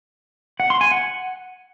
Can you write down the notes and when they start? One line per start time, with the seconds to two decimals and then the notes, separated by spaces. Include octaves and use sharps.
0.60 F#5
0.70 C6
0.81 G#5
0.91 F#5